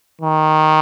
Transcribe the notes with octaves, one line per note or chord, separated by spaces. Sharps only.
D#3